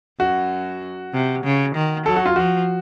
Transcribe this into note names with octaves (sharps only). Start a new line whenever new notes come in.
F#2 F#4
C3
C#3
D#3
F#3 A4
F#4
F4
F3 F#4